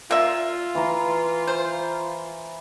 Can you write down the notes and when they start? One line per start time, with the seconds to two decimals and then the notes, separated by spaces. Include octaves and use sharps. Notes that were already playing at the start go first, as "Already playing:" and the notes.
0.11 A#3 F4 E5
0.75 E3 A#5
1.47 C5